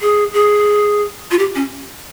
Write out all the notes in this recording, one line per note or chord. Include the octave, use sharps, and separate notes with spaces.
G#4
G#4
F4
G4
C#4